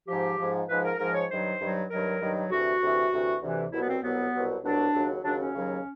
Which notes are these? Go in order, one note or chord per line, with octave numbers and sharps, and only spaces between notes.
G#2 F3 G4
G#2 F3
G#2 F3 B4
A#4
G#2 F3 A#4
C#5
G2 D#3 F#3 C5
G2 D#3 F#3
G2 D#3 F#3 A#4
G2 D#3 F#3
D2 C3 E3 F#4
D2 C3 E3
D2 C3 E3
D2 C3 E3
C2 B2 F#3 E4
B3
C4
C2 B2 F#3 B3
C2 B2 F#3
C2 B2 F#3 D4
D#2 C#3 F#3
D#2 C#3 F#3 D4
C#4
D#2 C#3 F#3